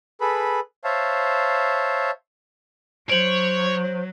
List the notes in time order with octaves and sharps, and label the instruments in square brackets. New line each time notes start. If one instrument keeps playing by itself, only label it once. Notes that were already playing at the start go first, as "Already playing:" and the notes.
[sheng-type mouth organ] G#4 A4 B4 B5
C5 C#5 E5 F5 A5
[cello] F#3 [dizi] C5 [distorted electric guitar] C#5 [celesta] D7 F#7